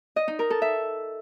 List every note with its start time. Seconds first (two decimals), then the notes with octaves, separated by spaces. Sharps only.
0.16 D#5
0.28 D#4
0.39 A#4
0.50 A4
0.62 E5